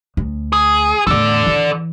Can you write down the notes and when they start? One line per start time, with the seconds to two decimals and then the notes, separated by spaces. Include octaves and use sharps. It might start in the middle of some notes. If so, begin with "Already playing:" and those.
0.17 D2
0.52 G#4
1.07 E2 A2 A4 D5
1.47 E3